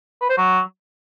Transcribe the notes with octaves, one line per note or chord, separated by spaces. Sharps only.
B4
C5
F#3